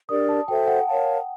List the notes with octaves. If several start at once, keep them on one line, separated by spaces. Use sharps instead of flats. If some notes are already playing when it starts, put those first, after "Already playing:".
D4 G4 A#4 D5 D#6
A5
F#4 A4 C5 E5 G5
F#5
A#4 C#5 F5 A5